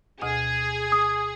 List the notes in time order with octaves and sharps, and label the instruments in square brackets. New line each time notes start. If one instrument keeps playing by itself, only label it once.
[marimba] D2 B2 D#5 [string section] G#4
[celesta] D#6